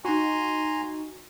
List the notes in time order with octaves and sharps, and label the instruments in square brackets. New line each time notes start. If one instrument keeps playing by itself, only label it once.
[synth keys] D#4 F#4 [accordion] G#5 A#5 C6